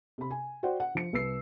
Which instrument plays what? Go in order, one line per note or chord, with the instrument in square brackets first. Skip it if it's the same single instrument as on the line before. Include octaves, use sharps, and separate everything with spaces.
[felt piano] C3 B5
G#5
F#4 C5 D5 F#5 G5
F#5
F3 C#7
C2 B4 E6 C7